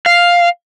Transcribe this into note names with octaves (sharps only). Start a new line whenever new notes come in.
F5